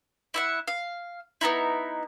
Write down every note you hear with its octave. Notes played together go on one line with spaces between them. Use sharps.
E4 E5 F#5
F5
B3 C4 D#4 E4